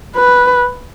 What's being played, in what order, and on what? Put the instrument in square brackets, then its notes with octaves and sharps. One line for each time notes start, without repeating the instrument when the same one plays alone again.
[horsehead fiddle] B4